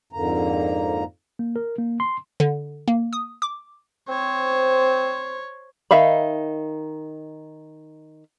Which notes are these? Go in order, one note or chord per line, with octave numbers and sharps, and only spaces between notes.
F2 G#2 D3 A#3 A#5
A#3
A#4
A#3
C6
D3
A#3
D#6
D6
C4 C5 C#5
D#3 D#4 E5 F5 B5